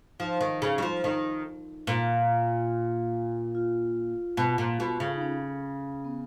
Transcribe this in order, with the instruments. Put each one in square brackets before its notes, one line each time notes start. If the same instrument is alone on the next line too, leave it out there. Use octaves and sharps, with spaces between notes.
[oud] F3 [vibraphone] D#4
[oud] D#3
C#3
F#3
F3
D#3
[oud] A#2 [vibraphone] F4
[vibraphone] F4
[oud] B2
A#2
B2
C#3
[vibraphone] D#4
C#4
B3